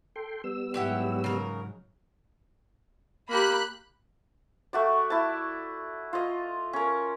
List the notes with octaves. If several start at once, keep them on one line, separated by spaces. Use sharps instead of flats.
A4 G5 C6
G3 B3 E6
G#2 F#3 E4 G4 F#5
C#3 A#4
A#3 G4 B5 F#6
A3 F#4 D5
E4 A5
F4 D#5
C#4 A#4